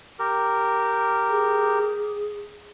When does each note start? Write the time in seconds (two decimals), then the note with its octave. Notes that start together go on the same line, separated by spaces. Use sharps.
0.19 G4 A#4
1.30 G#4